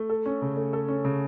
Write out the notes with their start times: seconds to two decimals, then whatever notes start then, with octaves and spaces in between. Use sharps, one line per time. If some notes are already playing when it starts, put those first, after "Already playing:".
Already playing: A3
0.09 A4
0.26 C#4
0.42 C#3
0.57 A3
0.73 A4
0.88 C#4
1.05 C#3